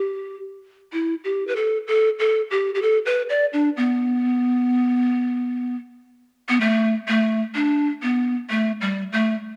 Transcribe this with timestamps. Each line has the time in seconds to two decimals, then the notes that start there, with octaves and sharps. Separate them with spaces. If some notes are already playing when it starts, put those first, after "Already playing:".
Already playing: G4
0.93 E4
1.24 G4
1.47 B4
1.56 A4
1.87 A4
2.19 A4
2.51 G4
2.75 G4
2.82 A4
3.06 B4
3.29 D5
3.53 D4
3.77 B3
6.49 B3
6.61 A3
7.08 A3
7.55 D4
8.02 B3
8.50 A3
8.81 G3
9.13 A3